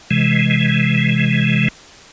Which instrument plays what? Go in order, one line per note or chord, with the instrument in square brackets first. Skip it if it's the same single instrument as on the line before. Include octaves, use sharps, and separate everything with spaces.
[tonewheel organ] C3 E3 G#3